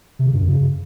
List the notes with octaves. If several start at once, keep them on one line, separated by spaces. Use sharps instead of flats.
C3
C#3
G2
F#2
C#3